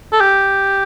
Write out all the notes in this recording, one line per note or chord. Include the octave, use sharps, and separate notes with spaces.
A4
G4